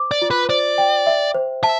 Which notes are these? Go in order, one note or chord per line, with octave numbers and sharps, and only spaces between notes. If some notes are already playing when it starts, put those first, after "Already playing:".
Already playing: C5 D6
D5
F4
B4
C5 D5
G5
E5
C5
E5 A5